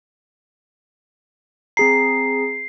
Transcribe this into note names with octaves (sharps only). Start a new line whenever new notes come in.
C4 G#4 A#5 C7